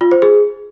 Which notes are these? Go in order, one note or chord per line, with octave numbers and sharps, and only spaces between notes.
F4
C5
G#4